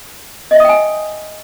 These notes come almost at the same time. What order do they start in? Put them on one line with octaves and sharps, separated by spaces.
D#5 E5 D#6 G5 G#5